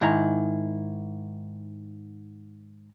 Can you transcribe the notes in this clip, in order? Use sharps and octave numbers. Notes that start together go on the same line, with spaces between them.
G#2 D#3 E4 A#5